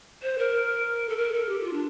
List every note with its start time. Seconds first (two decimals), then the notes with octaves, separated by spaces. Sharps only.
0.22 C5
0.38 A#4
1.09 A4
1.17 A#4
1.33 A4
1.49 G4
1.60 G4
1.64 F4
1.73 D4